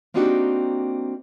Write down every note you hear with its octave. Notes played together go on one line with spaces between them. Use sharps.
A#3 C4 D4 D#4 F#4 G4